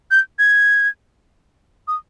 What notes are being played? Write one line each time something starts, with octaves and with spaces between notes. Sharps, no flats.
G6
G#6
D#6